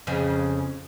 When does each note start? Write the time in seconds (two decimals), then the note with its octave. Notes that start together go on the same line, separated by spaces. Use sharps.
0.07 F2 C#3